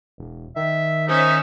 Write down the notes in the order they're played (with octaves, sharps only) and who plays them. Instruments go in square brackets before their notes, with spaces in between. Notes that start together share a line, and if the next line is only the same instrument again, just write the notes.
[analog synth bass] E1
[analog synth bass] D#3 [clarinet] E5
[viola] C#4 E5 [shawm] D#4 [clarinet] C5